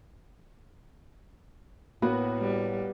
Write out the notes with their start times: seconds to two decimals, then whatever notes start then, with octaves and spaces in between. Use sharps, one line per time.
2.02 A2 A#3 B3 F#4 B4
2.38 G3